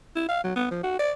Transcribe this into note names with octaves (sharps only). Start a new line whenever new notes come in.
E4
F5
F#3
B3
F3
F#4
D5